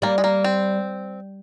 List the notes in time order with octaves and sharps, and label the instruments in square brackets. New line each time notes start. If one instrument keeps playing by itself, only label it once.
[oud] G3 [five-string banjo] A#3
[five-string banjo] G#3
A#3
C4